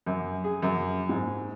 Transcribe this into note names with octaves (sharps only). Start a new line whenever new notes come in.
F#2
G#4
F#2
G#2